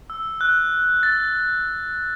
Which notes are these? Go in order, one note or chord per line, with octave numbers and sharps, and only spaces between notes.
E6
F#6
A6